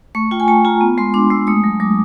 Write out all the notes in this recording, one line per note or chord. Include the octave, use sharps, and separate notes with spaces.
A3 C#6
F4 G5
G#5
A3 A5
F4 A#5
B3
G#3 C6
D4 D6
G#3 E6
A3 D#6
F#3
F#3 D6